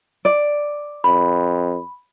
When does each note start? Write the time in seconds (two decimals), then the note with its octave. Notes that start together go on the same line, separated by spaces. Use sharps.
0.25 D5
1.04 F2 B5